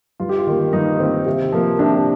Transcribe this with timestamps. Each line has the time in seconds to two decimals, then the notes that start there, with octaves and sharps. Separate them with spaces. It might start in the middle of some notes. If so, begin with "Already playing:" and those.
0.20 G2 F4
0.29 G4
0.38 F4
0.47 D#3 A#3
0.73 G2 D#4
0.99 D#3 A#3 C4
1.26 C3
1.52 F3 A#3
1.79 C3 D4